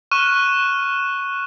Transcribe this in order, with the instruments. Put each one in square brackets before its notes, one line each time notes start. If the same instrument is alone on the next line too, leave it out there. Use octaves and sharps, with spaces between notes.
[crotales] C#6 F6 F#6 D#7 E7